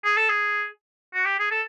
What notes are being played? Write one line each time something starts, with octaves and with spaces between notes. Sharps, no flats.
G#4
A4
G#4
F#4
G4
G#4
A4